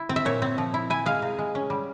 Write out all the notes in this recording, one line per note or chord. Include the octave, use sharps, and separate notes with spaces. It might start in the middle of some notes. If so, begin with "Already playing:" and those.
Already playing: E4
C4
E5
A#2 C#5
C4
F3
E4
E4 G#5
G#3 F5
C3
G#3
C#4
G3